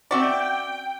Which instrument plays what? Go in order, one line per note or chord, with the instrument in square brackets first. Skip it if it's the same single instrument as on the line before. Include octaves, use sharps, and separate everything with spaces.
[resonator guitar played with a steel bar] C4 C#4 E5 [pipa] F#4 D5 [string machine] G5